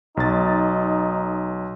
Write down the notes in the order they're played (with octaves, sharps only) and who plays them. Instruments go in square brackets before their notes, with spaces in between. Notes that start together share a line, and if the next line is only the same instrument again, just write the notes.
[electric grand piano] B1 A6 [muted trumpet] D#4